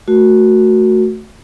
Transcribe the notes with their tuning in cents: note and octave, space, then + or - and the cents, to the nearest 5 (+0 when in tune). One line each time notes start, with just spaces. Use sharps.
A3 +0 F#4 +0 A#4 +0